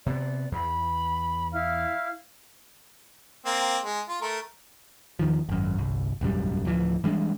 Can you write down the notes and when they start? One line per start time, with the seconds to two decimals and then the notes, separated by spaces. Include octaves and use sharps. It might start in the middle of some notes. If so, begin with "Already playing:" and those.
0.06 C3 B3 D5
0.52 E2 B5
1.52 E4 F5 F6
3.46 A#3 C4
3.83 G#3
4.08 F4
4.21 A3 A#4
5.19 E2 D#3 F3
5.49 G#1 F#2
5.78 G1 C2
6.21 E1 A1 F#2 G3
6.65 A1 D2 E3 F3
7.04 E3 G3 G#3 D4